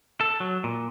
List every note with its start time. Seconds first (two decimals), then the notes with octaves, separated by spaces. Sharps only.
0.21 A4
0.40 F#3
0.64 A#2